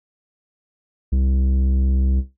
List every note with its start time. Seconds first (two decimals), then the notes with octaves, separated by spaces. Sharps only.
1.12 C2